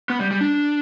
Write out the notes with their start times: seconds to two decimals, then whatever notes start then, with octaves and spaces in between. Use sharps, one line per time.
0.10 B3
0.20 G3
0.31 G3
0.41 D4